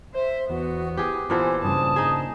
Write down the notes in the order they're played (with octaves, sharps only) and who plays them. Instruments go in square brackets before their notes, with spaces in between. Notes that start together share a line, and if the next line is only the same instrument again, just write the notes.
[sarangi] C5 [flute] E5
[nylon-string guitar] E2 [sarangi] B3 [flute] F#4
[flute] E4 [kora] G4 G#4
[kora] A#2 E3 A4 [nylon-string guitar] B3 [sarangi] C5 [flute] G#5
[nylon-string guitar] G2 C#3 C5 [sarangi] A5 [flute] D#6
[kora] D#4 G#4